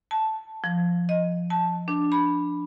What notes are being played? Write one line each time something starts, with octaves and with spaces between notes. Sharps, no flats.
A5
F3
D#5
A5
D4
B5